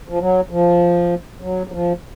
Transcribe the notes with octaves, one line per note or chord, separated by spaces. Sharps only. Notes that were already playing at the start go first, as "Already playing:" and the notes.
F3
F#3
F3
F#3
F#3
F3